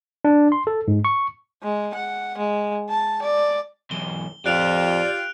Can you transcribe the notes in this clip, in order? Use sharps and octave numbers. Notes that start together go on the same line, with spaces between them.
D4
C6
A4
G#2
C#6
G#3
F#5
G#3
A5
D5
B1 E3 G7
F2 F4 G4 D5 F5 F#6 D7 F7